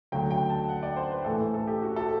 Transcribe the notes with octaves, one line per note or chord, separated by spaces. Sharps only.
D2 D3 F#3 A3 G5
G5
A5
F#5
D5
C5
B4
A2 E3 A3 A4
A4
G4
F#4
A4